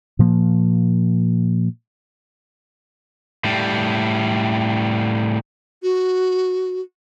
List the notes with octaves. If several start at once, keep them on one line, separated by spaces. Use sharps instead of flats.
A#2 F3 A#3
A2 G3
F#4